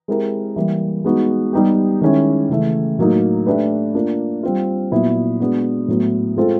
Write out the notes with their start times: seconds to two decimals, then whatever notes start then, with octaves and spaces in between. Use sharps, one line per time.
0.08 G#3 C4 E4 G4 A#4
0.56 E3 G3 A#3
1.05 G#3 B3 D#4 F#4
1.53 G3 B3 D#4 G4
2.01 D#3 G#3 C#4 E4
2.49 C#3 E3 A3
2.99 A2 F#3 A#3 D#4
3.47 A3 D4 G4 B4
3.95 A#3 D4 F4
4.43 G3 C4 F4
4.91 A#2 F#3 B3 E4
5.40 G#3 B3 D4 F#4
5.88 A2 F#3 B3 E4
6.36 G#3 C4 F4 A4 C5